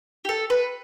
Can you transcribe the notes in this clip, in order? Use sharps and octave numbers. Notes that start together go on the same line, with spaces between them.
G4
A4
B4